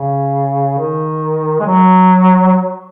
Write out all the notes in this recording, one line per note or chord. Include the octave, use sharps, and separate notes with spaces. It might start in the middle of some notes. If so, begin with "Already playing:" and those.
Already playing: C#3
D#3
G#3
F#3